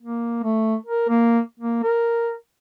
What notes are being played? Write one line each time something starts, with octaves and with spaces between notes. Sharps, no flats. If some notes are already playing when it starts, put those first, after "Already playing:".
A#3
A3
A#4
A#3
A#3
A#4